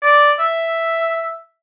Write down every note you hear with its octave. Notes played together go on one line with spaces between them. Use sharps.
D5
E5